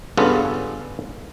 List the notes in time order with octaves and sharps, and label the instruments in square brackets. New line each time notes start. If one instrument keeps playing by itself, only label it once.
[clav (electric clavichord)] G2 C#3 B3 C#4 F4 A4